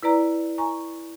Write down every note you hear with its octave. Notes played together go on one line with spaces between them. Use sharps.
E4 B4 D5 A#5
G#5 A#5 C#6